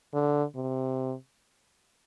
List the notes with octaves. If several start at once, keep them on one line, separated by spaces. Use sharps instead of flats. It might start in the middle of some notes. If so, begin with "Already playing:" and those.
D3
C3